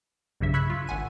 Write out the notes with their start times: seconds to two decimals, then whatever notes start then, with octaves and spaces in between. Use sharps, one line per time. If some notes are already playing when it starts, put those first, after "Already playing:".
0.40 B1 G2 C#3 E5
0.54 B5 C#6 E6 F#6 G#6 B6
0.70 F4
0.87 G#1 F#5 G#5 D#7